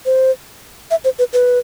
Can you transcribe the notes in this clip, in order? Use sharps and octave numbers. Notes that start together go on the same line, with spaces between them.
C5
E5
C5
B4
B4